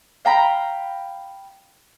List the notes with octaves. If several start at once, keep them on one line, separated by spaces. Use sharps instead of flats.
F5 G5 A#5 B5